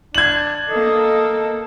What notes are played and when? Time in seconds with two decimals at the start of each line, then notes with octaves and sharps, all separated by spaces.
0.15 D4 G#6 F#7
0.69 A#3 A4 D#5